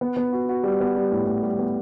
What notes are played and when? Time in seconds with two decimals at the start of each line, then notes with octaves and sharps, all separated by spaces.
0.01 B3
0.17 B3
0.33 F#4
0.49 F#4
0.63 G3
0.80 B3
0.96 G3
1.12 A2
1.27 A2
1.43 G3
1.59 B3